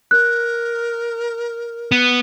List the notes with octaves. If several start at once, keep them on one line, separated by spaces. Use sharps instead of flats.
A#4 F#6
B3